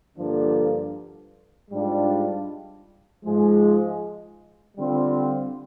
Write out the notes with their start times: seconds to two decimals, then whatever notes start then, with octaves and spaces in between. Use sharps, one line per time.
0.17 G2 D3 F3 A#3 D4
1.70 G#2 G3 D4 F4
3.23 G#2 F3 G#3
4.76 D3 G3 C4 F4